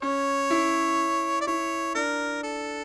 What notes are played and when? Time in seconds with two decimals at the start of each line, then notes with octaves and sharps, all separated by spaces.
0.02 C#4 C#5
0.50 E4
1.41 D5
1.47 E4 C#5
1.95 D4 A#4
2.44 A4